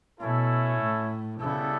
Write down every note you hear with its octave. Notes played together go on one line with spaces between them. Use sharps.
B2 A3 C#4 E4 A4
A2
C#3 G3 B3 E4 A4